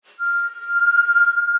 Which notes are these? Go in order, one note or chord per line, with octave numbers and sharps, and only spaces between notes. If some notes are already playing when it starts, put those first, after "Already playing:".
F6